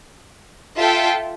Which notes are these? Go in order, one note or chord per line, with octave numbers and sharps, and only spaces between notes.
F4 A4 E5 G5